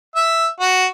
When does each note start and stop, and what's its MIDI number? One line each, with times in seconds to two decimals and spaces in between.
0.16 0.47 76
0.60 0.86 66